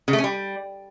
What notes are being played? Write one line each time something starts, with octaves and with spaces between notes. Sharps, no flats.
C#3
A3
C#4
G3